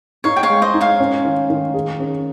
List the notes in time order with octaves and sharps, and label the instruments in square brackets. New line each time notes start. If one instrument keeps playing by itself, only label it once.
[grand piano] D#4 [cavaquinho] C#5 F5
[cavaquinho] G5
C#5 F5
[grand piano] G#3
[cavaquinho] C5 D#5
[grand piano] D#4
[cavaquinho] C#5 F5
[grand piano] C#4
D#3
D#3
G#4
C#4